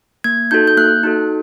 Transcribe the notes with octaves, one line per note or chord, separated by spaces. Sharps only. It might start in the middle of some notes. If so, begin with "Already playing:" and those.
A#3 G#6
D#4 F#4 A4 G6
G6
A#3 F#6
D#4 F#4 A4